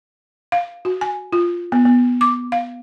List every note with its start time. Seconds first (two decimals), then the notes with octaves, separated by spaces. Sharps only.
0.52 F5
0.85 F#4
1.01 G#5
1.33 F4
1.72 B3
1.85 B3
2.21 D6
2.52 F5